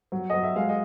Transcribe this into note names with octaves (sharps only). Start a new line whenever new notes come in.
F#3
F#3 D#5
E5
G#3 F5
D#5